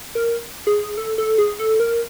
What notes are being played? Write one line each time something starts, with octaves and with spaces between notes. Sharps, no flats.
A#4
G#4
A4
A4
G#4
A4
A#4